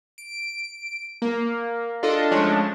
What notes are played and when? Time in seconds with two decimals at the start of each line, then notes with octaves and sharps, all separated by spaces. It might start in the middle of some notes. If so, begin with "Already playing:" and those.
0.18 D7
1.22 A#3
2.03 D4 F4 A4 D#5
2.31 F3 G#3 A3 C#4 D4